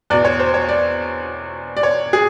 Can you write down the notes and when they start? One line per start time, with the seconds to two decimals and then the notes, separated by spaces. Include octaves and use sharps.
0.10 E2 B2 D5
0.25 C#5
0.40 C5
0.54 C#5
0.69 D5
1.77 D5
1.83 C#5
2.13 G#4